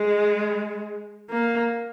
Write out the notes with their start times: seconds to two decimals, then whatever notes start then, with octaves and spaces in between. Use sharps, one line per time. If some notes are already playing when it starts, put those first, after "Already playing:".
Already playing: G#3
1.30 A#3